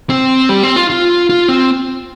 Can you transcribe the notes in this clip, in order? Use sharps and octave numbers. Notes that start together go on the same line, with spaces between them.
C4
G3
C4
F4
F4
F4
C4